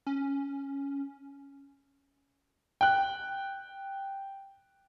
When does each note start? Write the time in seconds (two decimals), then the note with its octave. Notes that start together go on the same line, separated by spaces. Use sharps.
0.07 C#4
2.81 G5 F#6